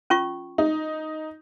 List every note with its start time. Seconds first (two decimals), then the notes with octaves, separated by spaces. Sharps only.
0.10 C#4 F4 C#6
0.58 D#4